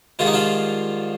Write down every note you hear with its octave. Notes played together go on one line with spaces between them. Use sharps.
G#2 D#3 G3 F4
D#4
F3 F4